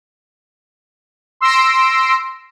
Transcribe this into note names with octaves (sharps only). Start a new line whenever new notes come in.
C6 E6 A#6 C7 D7